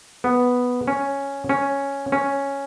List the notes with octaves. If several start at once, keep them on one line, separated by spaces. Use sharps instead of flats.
B3
C#4
C#4
C#4